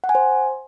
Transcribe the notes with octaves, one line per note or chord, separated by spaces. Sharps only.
F#5
G#5
C5